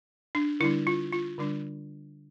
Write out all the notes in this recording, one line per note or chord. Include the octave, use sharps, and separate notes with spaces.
D4
D3 G3 D4 E4
F4
F4
D3 G3 D4